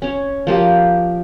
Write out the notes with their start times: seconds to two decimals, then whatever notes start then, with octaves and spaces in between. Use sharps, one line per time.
0.02 C#4 C#5
0.47 F3 A#3 G4